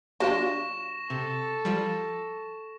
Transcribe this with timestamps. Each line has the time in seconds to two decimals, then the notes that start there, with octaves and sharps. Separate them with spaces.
0.20 F#3 D4 F4 G4 C#6 A#6 E7
1.10 C3 A4
1.65 F3 G3